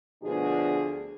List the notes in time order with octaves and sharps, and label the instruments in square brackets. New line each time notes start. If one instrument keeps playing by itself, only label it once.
[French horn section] D2 B2 F3 A3 D4 G#4